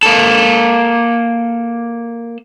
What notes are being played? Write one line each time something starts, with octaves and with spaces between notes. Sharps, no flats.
A#3 A4